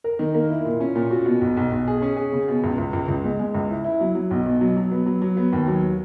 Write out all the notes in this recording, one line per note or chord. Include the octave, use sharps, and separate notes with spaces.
A#4
D#3
A#3
E4
A#2
C#4
A#2
F#4
B2
B1
B1
B1
G#4
C#4
G#4
C#3
B2
C#2
C#2
C#2
C#2
G#3
G#3
C#2
E4
E4
F#3
F#3
B1
B2
F#3
F#3
B3
F#3
F#3
B3
D#2
F#3